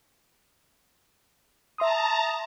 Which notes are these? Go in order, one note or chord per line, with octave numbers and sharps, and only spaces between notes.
E5 A5 A#5 C6 D#6